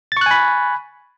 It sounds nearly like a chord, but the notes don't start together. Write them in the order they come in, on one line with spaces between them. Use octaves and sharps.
A6 C#6 F#6 G#5 B5